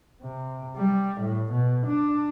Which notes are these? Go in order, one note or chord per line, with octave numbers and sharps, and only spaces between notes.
C3
G3
A2
B2
D4